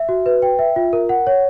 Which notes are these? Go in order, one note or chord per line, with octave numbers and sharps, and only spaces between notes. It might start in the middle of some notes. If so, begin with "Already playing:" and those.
Already playing: E5
F#4
B4
G5
E5
F4
A#4
F#5
C#5